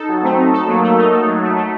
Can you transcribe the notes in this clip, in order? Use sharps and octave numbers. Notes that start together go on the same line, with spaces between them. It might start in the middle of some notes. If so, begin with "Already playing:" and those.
Already playing: D#4 A4
F#3
A3 C4
D#4
A4
F#3 A#3
A3
D#4
A4
F#3
A3
A3